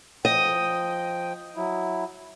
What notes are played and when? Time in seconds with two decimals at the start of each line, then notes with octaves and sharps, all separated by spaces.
0.25 F3 D#5 G5
1.56 F#3 E4